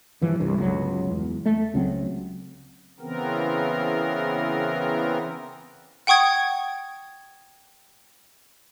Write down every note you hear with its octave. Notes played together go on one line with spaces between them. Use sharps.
G2 E3 F3
C2 G2
G1 C#2 F#3
E2
A3
C#2 C#3 F#3 C4
C#3 E3 B3 C4 A#4
F#5 G5 C#6 D#6 G#6